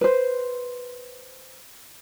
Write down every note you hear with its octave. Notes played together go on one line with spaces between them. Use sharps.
B4 C5